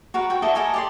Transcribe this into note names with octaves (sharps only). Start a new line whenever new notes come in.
F#4 A#4 B4
F#4 G5
E4 A4 D5 D#5
A4 A#4 D#5 G#5
G4 D5 C6